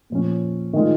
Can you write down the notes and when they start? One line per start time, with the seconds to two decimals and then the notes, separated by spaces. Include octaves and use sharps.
0.10 A#2 F3 C#4
0.73 D#3 G#3 F4